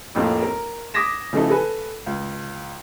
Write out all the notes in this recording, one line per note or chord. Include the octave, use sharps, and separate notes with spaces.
A1 F2 A2 A#3
A#4
D6 D#6 G#6 A#6 B6 E7
C#3 E3 F3 A3 D#4 A4
A4 B4 G#5
C#2